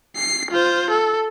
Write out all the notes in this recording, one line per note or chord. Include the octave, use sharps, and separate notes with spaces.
C7
F4 C5
A4